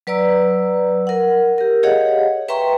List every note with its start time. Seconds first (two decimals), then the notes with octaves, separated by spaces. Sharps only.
0.07 F#3 B4 D5 A#5 E6
1.07 A#4 F#5
1.58 G4 A#4
1.83 G4 G#4 C#5 D#5 F5 F#5
2.48 B4 E5 G5 A#5 C6 C#6